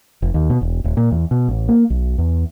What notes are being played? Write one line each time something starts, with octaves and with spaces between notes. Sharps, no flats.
F1
D#2
B2
E1
D#1
A#2
E2
B2
A1
A#3
B1
E2